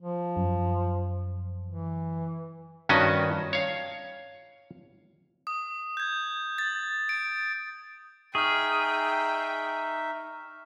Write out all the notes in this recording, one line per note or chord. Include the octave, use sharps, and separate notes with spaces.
F3
F#2
E3
G2 D#3 C#4 F#4 D#5
C#5 F5
D#6
G6 G#6
A6
D7
D#4 G#4 E5 G5 C#6 F6